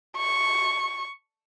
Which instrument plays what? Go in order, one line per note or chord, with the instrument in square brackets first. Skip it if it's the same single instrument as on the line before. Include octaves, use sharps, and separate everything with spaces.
[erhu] C#6